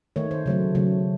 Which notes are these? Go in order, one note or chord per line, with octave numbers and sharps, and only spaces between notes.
D#3 A3 C#5
C5
C#3 F#3 A3
C#3 F#3 A3